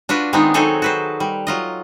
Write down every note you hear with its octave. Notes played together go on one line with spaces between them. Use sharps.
D4 F4 F#4 B4
D#3 G#3 B3 C4 D4 D#4
F#3 C4 D#4 G#4 A4 C#5
F#4 B4 C5
G3
F#3 F4 D#5